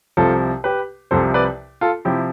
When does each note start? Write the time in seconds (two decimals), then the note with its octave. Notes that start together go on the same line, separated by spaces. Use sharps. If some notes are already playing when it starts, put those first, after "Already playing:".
0.17 C2 C3 F3 F4 A4
0.64 G4 B4
1.11 C2 C3 F3 A4 C5
1.34 B4 D5
1.81 F4 A4
2.05 C3 F3 E4 G4